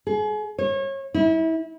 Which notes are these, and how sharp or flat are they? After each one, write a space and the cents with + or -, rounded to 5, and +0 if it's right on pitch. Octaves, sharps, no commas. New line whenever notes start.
G#4 +35
C#5 -30
E4 -30